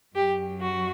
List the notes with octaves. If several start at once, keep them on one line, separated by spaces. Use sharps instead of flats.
F#2 F#3 G4
F#4